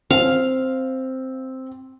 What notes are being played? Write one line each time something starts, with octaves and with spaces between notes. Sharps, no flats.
C4 F5